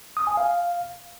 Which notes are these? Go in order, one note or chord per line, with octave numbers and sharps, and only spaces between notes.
D#6
G#5
F5